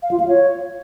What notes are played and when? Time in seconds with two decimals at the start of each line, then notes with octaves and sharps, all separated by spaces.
0.03 F5
0.11 F4
0.20 F5
0.28 C#5